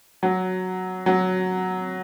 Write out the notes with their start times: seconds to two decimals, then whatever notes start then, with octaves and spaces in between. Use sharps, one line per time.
0.23 F#3
1.06 F#3